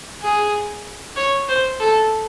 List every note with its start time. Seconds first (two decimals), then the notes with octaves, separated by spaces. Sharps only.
0.22 G#4
1.16 C#5
1.49 C5
1.80 A4